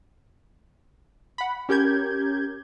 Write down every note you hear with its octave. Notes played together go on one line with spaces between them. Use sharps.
F#5 B5
C#4 G4 A#4 G6 G#6